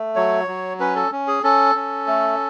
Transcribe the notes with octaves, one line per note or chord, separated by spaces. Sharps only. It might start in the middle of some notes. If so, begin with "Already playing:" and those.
Already playing: A3
F#3 C#5
F#3
C#4 B4
A4
C#4
G#4
C#4 A4
C#4
A3